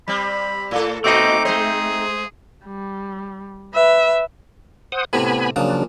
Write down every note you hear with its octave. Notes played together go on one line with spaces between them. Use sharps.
G3 C4 B5
A2 A4
A#2 A3 C4 D#4 F#4 D#5 D6
G#3 G#4 C5
G3
B4 E5
C5 F#5 D#6
A2 C3 B3 C4 G#5 B5
A#2 C#3 F3 F#3 D4 D#6